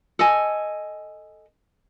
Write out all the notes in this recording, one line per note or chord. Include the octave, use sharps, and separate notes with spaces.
A4 D#5 G#5